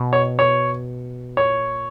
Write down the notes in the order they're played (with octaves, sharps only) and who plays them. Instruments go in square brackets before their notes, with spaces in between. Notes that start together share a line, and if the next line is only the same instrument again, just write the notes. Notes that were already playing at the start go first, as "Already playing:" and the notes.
Already playing: [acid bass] B2
[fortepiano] C#5
C#5
[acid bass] A#2 [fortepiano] C#5